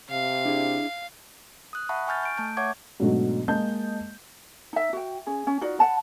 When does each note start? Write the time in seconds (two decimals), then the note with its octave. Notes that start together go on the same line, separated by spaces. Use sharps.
0.11 C3 F5
0.45 D4 E4 G#4
1.73 D#6 F#6
1.89 E5 F#5 A5 B5 C#6
2.07 G#5 C#6 F6 G6 A6
2.23 G6 D7
2.38 A3 A5 G6
2.57 C#5 E5 F#5 C#6 D6 G#6
3.00 G#2 B2 F#3 A3 D4 F#4
3.48 G#3 A#3 D#5 A5 G6
4.73 D#4 E5
4.93 F#4 G5
5.27 C#4 G#4
5.47 C#4
5.61 D#4 F4 F#4 D5
5.79 F#5 A5 B5